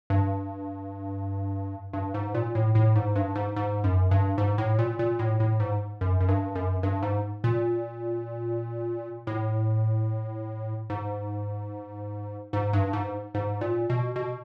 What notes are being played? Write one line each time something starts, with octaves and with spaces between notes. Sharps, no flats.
G2
G2
G#2
A#2
A2
A2
G#2
G2
G#2
G#2
F#2
G2
G#2
A2
A#2
A#2
A2
A2
G#2
F#2
F#2
G2
F#2
G2
G#2
A#2
A2
G#2
G#2
G2
G#2
G#2
A#2
B2
B2